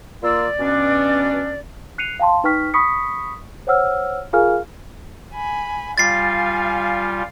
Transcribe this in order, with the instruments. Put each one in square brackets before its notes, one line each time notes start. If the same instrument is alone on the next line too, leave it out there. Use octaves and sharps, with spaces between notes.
[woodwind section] A#3 F4 E6 [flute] D5
[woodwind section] B2 C#4 D4
[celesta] F#6 C7 C#7 D#7 F7
F5 G5 A5 C6
D#4 B4 G5 C#6 F6 B6
B5 C#6 D#6 B6 C#7
C5 C#5 F#5 E6 F6
F4 G#4 A#4 F5 G#5 F6
[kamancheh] G#5 B5
[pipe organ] G3 F4 [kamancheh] F5 G#5 [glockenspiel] A6 C7